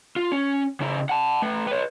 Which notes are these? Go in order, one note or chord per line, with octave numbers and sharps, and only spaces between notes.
F4
C#4
C#3 E4
F#5 A5
A3 B4
B4 C#5